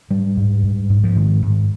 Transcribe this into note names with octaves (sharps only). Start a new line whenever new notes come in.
G#2 G3
G#2
G#2
G#2
F3
G#2 D#3
G#2